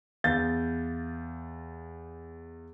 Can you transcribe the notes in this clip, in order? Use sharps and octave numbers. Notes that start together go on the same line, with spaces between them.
E2 F5 G6 A6